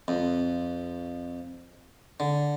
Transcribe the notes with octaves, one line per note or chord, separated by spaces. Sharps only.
F2
D3